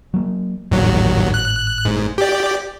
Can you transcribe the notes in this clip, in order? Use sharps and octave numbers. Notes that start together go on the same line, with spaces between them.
F#3 A#3
G#1 D#2 A2 F#3
F#6
G#2
G4 D5